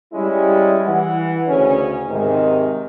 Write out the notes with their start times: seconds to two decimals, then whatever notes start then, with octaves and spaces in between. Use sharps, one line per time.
0.12 G3 G#3 C#4 E4
0.87 E3 F#5
1.48 D2 C#3 C#4
2.09 G#2 C3 D#3